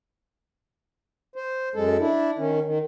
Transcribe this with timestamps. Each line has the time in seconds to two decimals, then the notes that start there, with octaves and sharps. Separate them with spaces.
1.36 C5
1.75 F#2 G#3 A4
1.99 D4 E4
2.38 D#3 C#4
2.64 D#3